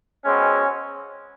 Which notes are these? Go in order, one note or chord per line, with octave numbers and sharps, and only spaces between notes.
B2 G#3 C4 C#4